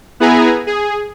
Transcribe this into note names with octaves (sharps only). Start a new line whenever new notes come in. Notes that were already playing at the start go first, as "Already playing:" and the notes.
B3 E4 G#4 B4 G#5 A#5
G#4